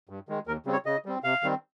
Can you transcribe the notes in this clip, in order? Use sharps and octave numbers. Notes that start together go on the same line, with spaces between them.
G2
D#3 G#3
D#2 A#4
C#3 G3 C4
C#5
C#3 D#5
G3 C4
C3 F5
D#3 G3 C4